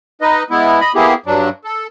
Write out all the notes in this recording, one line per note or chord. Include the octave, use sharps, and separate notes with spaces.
D#4 B4 D#5
G#3 B3 E4
D#5 B5
A#3 B3 E4 G4 G#4
G2 F#3 D4
A4